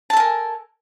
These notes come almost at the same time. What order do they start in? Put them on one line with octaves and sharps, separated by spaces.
A5 A4 G#5 A#4